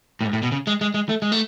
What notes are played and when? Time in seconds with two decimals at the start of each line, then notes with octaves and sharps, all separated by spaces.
0.21 A2
0.24 G#2
0.33 A2
0.43 B2
0.52 C#3
0.67 G#3
0.81 G#3
0.94 G#3
1.09 A3
1.22 G#3
1.32 A3